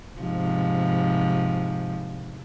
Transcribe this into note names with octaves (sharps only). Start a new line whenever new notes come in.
G#2 C3 F3